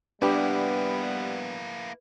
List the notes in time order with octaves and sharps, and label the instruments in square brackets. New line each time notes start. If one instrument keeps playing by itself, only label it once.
[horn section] G3 B3 [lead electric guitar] A#3 E4 [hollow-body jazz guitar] D4 G4 [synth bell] B4